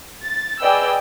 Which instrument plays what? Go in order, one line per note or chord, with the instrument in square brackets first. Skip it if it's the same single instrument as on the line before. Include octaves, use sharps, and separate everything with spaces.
[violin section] A6
G#4 B4 D5 D#5 G5 E6